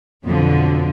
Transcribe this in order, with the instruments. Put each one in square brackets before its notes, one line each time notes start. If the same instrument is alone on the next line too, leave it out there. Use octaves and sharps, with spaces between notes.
[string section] B1 F2 B2 D3 F3